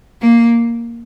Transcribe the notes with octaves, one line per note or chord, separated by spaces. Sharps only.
A#3